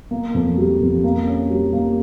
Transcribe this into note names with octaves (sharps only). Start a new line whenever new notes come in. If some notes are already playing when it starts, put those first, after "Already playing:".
A#3
F2
G3
F2
A#3
C#4
G3
A#3